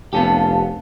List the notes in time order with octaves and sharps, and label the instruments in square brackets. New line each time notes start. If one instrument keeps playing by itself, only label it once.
[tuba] F1 [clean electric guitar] B3 C#4 G4 [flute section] F5 A5